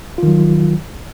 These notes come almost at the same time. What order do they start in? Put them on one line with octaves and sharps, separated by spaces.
F4 D#3 F#3